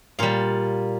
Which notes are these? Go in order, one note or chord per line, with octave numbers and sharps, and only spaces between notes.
A#2 G3 F5